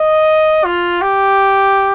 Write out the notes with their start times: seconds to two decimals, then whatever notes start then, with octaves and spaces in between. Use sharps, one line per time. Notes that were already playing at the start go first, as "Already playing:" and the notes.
Already playing: D#5
0.64 F4
1.01 G4